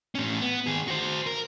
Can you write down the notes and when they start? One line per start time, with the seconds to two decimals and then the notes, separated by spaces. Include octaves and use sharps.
0.15 A2 C#4
0.40 B3
0.67 D#3 G#4
0.88 F#4 C5
1.26 A#4